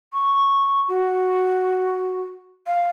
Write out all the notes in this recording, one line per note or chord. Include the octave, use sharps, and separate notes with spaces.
C#6
F#4
F5